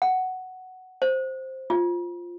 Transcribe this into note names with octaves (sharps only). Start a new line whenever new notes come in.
F#5
C5
F4